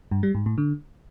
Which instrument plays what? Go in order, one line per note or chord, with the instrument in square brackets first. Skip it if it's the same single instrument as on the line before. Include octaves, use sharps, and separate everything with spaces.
[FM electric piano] G2
G3
G#2
A2
D3